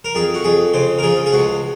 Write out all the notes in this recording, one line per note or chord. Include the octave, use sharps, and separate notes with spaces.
A#4
F2 G#4
F#4
F2 G#4
C#3 C5
A#4
F3 G#4
G#4
C#2 F#4